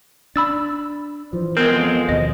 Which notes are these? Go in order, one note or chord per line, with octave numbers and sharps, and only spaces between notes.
D4 B5 E6 A6
E3 F3 C5
G#3 B3 C4 A#4 G6
F2 G#3
D#2 B2 D#5